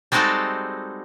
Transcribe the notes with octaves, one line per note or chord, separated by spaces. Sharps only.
G3 G#3 C4 D#4 F#4 A4